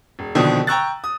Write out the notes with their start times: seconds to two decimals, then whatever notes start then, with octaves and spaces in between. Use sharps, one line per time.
0.19 E1
0.35 A#1 B2 D3 D#3 F3 D#6
0.67 G5 A#5 C#6 E6 F#6 A6
1.04 D#6